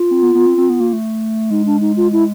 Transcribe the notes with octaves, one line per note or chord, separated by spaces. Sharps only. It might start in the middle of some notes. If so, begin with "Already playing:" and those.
Already playing: F4
C4
B3
B3
C4
C4
B3
A#3
A3
G#3 D#4
D4
D#4
F4
E4